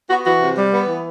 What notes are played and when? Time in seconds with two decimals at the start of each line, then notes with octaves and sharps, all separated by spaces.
0.08 B3 F#4
0.24 E3 F#4
0.40 C3
0.56 G3
0.72 B3
0.87 E3